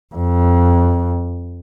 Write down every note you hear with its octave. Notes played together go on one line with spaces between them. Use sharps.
F2